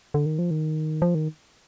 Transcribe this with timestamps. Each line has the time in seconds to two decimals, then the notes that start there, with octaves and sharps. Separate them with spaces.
0.14 D3
0.26 D#3
0.39 F3
0.51 D#3
1.02 F3
1.15 D#3